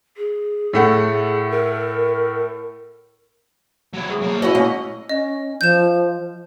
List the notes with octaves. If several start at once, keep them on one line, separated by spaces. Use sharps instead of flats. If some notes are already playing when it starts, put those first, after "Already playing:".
G#4
A2 A3 F#5
A#4
F#3 E4
G#4
F#3 A#3 A5
C#4 E4 F#4 D#5
A#3 C#4
C#4 D#5
F3 G6 E7